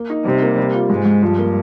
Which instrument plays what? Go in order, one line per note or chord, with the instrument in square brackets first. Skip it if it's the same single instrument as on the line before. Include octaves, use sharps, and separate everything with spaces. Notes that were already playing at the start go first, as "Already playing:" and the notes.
Already playing: [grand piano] A#3
D#4
[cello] C3 [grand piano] G3
[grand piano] A#3
G3
F4
[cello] G#2 [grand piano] G#3
[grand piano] G#3
[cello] G2 [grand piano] F3
[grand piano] A#3